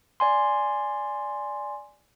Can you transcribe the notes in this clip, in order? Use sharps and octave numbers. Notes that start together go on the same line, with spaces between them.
D5 G#5 C6